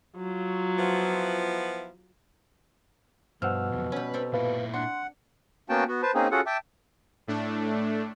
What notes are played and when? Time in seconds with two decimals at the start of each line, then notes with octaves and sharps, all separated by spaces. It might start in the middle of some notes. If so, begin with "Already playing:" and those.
0.16 F#3 F4
0.77 F3 B3 E4
3.42 G2 B2 F3 F#5 E6 F6
3.72 B1 F2
3.92 G3 C#4 B4
4.14 C4 A4 A#4
4.34 A#2 E4 B4 F5
4.74 D4 F#5 C6
5.69 A#3 B3 C#4 F#4 G5 A5
5.88 B3 F#4
6.02 B4 C5 A5
6.15 A#3 C4 C#4 D#4 G#4
6.31 C#4 F4 F#4 G#4 A4 F#5
6.46 E5 G5 A5 D6
7.27 A2 A3 D4